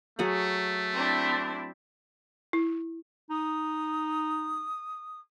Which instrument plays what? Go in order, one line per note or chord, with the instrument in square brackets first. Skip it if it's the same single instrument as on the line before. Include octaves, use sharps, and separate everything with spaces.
[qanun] F#3 G#4 F#5 [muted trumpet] A3
[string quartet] C4 D4 E4
[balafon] E4
[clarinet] D#4 [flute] D#6